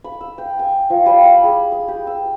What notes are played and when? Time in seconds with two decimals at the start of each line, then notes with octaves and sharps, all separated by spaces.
0.04 B5
0.21 E6
0.38 G5
0.59 G#5
0.90 F3
1.06 G3
1.23 B5
1.44 G#4
1.72 D#6
1.88 G4
2.07 E6